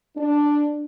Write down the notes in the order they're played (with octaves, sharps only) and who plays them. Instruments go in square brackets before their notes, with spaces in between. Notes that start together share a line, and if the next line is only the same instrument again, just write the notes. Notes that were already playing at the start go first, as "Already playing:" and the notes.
[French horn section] D4